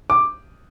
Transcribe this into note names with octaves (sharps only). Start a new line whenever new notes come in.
D6